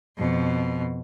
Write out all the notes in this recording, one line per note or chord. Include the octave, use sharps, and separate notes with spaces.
F2 B2